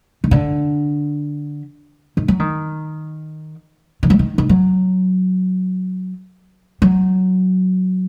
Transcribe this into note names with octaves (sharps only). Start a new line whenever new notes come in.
D#3
D3
D#3
F#3
D#3
D#3
F#3
D#3
D#3
F#3
F#3